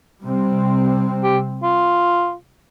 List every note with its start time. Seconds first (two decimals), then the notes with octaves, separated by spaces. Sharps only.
0.23 C3 G3 C4
1.23 G4
1.63 F4